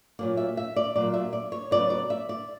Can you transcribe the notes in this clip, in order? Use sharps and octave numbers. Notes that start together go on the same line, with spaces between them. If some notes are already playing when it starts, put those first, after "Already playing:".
A#2 F#3 A#3 D5
E5
E5
D5
A#2 F#3 A#3 D5
E5
D5
C#5
C#3 F#3 B3 D5
D5
E5
D5